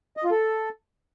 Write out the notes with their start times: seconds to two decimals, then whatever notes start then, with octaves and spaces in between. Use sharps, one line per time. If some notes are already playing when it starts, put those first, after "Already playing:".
0.17 D#5
0.24 F4
0.31 A4